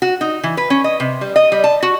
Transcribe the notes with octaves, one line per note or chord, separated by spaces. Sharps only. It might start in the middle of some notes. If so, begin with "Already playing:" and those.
F#4
D#4
E3
B4
C#4
D#5
C3
G3
D#5
G3
A5
F#4